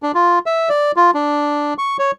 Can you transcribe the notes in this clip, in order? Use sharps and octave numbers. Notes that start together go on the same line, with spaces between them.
D4
F4
E5
D5
F4
D4
C#6
C#5